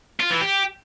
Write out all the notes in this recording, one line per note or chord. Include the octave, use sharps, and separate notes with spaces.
F4
E3
G4